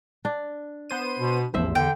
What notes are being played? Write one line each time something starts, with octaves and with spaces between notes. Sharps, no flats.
D4
B3 C5 D#7
B2
A1 E2 F3 C5 E5
E2 D3 G5